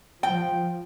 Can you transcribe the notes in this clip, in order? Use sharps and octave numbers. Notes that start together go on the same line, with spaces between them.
F3 G5